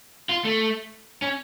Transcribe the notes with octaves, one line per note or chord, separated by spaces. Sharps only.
F4
A3
C#4